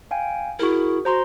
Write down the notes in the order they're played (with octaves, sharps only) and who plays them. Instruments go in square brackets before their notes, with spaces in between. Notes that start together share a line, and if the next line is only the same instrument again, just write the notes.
[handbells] F5 G5 G#5
[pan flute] E4 [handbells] F#4 G#4 A#4
[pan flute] F#4 [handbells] C5 A#5 C6